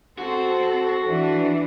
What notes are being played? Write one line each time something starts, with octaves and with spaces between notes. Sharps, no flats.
C4 F#4 A4
E3 D4